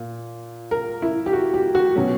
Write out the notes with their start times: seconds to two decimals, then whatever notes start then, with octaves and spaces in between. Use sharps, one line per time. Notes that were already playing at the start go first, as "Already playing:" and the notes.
Already playing: A#2
0.71 A#4
1.02 E4
1.26 G4
1.33 F#4
1.54 G4
1.75 F#4
1.95 B2 F#3 C#4